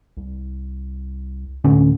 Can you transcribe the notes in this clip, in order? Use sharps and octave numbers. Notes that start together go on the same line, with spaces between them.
C2
D2 A2 D3 C#4